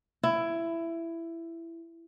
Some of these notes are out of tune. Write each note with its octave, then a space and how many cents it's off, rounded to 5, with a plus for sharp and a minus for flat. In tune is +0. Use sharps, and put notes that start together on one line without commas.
E4 +15